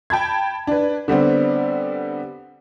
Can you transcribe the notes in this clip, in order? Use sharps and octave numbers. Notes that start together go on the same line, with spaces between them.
G5 A5 B5 G#6
D4 B4
D3 G3 B3 C4